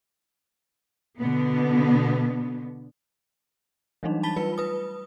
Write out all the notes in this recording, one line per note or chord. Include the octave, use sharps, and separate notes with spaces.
B2 D3 B3
E3 F#3 G3 A3 D4 D#4
A5 B5 A6 B6 G7
G3 F4 B4 C#7
B4 D#6